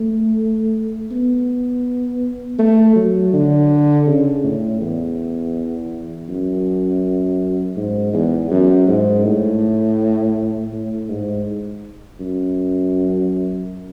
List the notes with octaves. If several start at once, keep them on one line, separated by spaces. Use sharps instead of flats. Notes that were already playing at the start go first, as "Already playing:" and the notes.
Already playing: A3
B3
A3
F#3
D3
C#3
A2
E2
F#2
G#2
E2
F#2
G#2
A2
A2
G#2
F#2